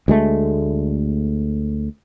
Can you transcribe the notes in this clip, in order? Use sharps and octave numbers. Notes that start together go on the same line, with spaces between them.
D2 G#3 A3